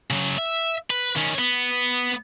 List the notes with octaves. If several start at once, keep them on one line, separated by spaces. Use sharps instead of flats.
C#3 F#3
E5
B4
D#3 C#4
B3